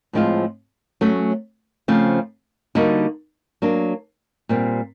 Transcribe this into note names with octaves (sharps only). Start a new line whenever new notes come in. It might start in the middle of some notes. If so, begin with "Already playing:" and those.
A2 F3 G#3 C4 F4
F#3 A3 C#4
C#3 F3 A3 C4
D3 G3 A#3 D#4 F#4
F#3 A#3 D4
A#2 G3 C4